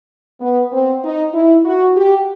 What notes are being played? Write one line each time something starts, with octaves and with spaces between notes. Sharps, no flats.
B3
C4
D#4
E4
F#4
G4